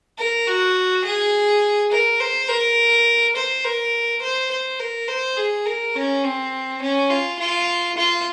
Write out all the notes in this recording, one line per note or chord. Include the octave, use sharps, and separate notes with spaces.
A#4
F#4
G#4
A#4
C5
A#4
C5
A#4
C5
C5
A#4
C5
G#4
A#4
C#4
C4
C#4
F4
F4
F4